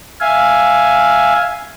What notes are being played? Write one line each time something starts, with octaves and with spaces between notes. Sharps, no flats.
E5 F5 G#5